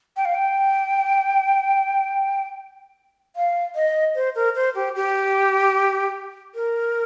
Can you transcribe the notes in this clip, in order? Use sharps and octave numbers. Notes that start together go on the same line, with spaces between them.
G5
F5
G5
F5
D#5
C5
A#4
C5
G4
G4
A#4